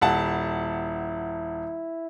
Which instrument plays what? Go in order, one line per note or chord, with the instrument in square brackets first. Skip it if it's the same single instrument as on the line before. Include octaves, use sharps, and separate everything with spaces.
[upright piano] D#1 F#5 A5 [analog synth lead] E4